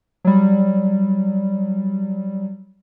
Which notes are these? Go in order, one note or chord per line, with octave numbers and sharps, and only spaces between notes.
F#3 G3